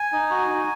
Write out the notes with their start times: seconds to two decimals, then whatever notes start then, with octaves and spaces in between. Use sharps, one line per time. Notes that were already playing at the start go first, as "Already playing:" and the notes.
Already playing: G#5
0.12 D#4
0.30 F#4
0.49 D#4